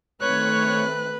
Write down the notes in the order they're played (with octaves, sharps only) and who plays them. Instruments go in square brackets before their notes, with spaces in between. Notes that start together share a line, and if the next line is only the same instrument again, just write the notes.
[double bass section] D#3 A3 C4 [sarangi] B4 [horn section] C#5 [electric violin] F#6